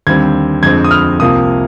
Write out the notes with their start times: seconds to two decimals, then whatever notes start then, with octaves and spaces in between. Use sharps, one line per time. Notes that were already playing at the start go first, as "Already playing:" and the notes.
0.07 D#2 D3 G3 C4 G#6
0.63 F2 D3 G#3 C4 G#6
0.84 D#6
0.91 F6
1.19 C2 C3 F3 A#3 D#6